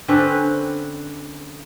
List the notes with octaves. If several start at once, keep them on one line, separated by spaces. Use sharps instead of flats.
D3 C4 C#4 B4